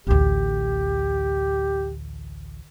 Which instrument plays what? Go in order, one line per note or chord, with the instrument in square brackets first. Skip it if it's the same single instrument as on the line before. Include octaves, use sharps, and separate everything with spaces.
[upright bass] A1 D2 [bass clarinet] G4